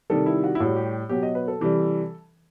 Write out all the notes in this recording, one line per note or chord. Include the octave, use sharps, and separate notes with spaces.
C3 D#3 G3 A4
E4
F#4
E4
A2 G3 F#4
G4
B2 F#3 G4
D#5
B4
A4
C3 E3 G3